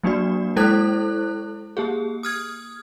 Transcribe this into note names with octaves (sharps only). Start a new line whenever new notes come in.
F#3 A#3 D4 F#4 D5
G#3 E4 A4 C5 F#6
A#3 G4 G#4
D#6 F6 G#6